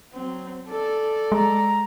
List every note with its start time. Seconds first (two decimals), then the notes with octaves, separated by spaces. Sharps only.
0.13 F#3 C4
0.68 A4 D5
1.32 G#3 A#5